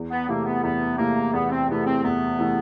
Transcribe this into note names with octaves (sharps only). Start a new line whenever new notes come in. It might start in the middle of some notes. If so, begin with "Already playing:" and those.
Already playing: E2
B3
C3 E3 A3 A#3
B3
E2 B3
C3 E3 A3 A#3
E2 B3
C4
C3 E3 A3 B3
C4
E2 B3
C3 E3 A3